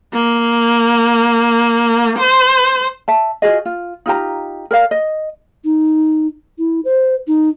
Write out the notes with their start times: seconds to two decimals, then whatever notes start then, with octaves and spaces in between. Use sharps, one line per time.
0.14 A#3
2.19 C5
3.08 E5 A5
3.42 F4 F#4 G#4 D#5
3.66 F4
4.06 D#4 F4 G4 A#5
4.71 A#4 D5 F5
4.91 D#5
5.65 D#4
6.58 E4
6.85 C5
7.27 D#4